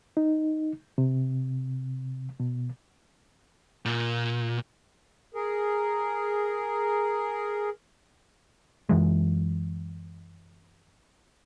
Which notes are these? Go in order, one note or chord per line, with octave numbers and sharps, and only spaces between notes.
D#4
C3
B2
A#2
G#4 A#4
F#2 E3 G#3